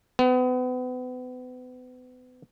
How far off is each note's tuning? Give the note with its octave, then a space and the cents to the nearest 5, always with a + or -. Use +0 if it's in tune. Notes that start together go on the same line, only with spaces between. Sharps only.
B3 +35